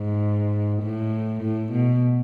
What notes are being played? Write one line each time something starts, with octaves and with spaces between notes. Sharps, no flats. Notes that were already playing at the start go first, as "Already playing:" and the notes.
Already playing: G#2
A2
A2
B2